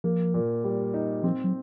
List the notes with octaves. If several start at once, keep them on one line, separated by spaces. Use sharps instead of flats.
F3 A#3
A#2
G3
D#4
F3 C4
F#3